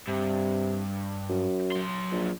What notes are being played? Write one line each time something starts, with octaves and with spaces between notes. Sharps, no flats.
G2 C3
F#2
F#3 C6
A#1